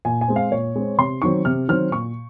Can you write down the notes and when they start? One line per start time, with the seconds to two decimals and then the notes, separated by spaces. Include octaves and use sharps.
0.05 A#2 G#5
0.21 G#5
0.28 G#3 C4
0.36 F5
0.52 A#2 C#5
0.76 G#3 C4
0.98 C3 C6
1.22 D#3 F#3 C4 C#6
1.45 C3 F6
1.68 D#3 F#3 C4 F6
1.91 A#2 C#6